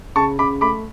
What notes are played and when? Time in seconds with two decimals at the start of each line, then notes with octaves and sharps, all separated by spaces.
0.16 C#3 A5 C#6
0.39 C#3 B5 D6
0.61 A3 B5 D6